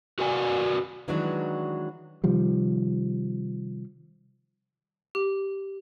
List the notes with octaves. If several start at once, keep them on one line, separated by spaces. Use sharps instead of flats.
F#4 A#4 B4 D5 G#5
D#3 E3 F#3 G#3 D4 F#4
C3 D#3 F3 G3
G4